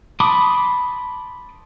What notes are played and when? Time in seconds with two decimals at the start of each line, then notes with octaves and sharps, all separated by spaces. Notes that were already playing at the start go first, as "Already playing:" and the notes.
0.20 A5 B5 C6 D6 D#6